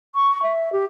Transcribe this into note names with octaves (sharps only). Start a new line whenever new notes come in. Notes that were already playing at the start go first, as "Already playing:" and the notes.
C#6
E5
G4